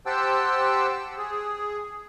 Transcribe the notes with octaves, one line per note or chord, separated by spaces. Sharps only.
G4 C5 F#5 G5 A5 E6
G#4